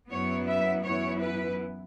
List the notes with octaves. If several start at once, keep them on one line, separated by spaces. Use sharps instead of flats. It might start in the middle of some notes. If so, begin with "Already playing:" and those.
F#2 F#3 B3 E4 C#5
E5
F#2 E3 B3 E4 C#5
B4